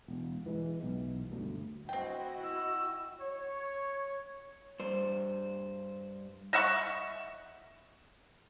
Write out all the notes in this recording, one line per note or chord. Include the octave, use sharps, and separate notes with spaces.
E1
E3 G#3
B1
G1 D2
C4 E4 F#4 D#5 G5
E6
C#5
G2 C5
D#5 E5 F#5 C#6